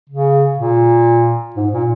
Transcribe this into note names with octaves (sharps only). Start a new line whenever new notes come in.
C#3
A#2
G#2
A#2